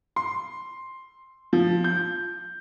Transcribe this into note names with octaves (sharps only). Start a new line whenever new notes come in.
C6
F3
G6